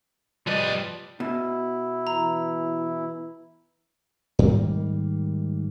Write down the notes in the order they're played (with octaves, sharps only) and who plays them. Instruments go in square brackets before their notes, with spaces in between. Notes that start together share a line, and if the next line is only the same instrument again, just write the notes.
[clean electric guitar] F3 B4 D5 [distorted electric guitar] G3 D#5
[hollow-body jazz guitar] B2 [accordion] E4
[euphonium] E3 [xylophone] A#5
[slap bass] G#2 D#3 G3 A#3